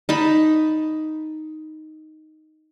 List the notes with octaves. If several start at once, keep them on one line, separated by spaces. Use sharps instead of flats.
D#4 A5 B5